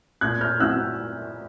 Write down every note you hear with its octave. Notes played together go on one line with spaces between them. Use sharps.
A#2 F#6 G#6
F6 G6
F#3 B3 E4 E6 F#6